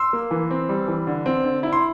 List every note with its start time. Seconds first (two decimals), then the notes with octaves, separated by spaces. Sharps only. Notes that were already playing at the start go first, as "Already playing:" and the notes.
Already playing: C6 E6
0.13 A#3
0.31 E3
0.51 C4
0.69 G3
0.88 E3
1.07 D3
1.26 C4
1.44 D3
1.63 E4
1.73 C6